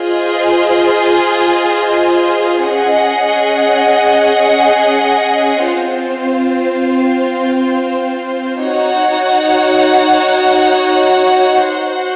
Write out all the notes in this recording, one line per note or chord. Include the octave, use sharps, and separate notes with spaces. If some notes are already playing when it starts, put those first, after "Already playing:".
Already playing: F4 G#4 C5 D#5
C#4 G#4 D#5 F#5
C4 F4 C5
D#4 F#4 C#5 F#5
F#4 C5 F#5